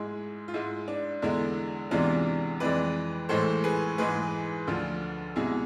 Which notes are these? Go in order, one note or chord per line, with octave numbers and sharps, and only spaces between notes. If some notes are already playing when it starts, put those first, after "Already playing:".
Already playing: G#2 G#3 E4 G#4
F4
G#2 G#3 E4
D4
E2 D3 G#3 E4
E2 C3 E3 G#3 D4 F4
F2 E3 G#3 B4 D5
A2 E3 G#3 A4 C5
G#4 B4
G#2 E3 G#3 G#4 B4
D2 D3 F3 F4 A4
C2 B2 G#3 E4 G#4